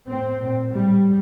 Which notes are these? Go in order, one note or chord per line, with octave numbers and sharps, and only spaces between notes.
A2 C4
A#2
A2 G3